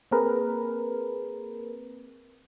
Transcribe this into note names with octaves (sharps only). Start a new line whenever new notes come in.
A#3 C4 G#4 A#4 B4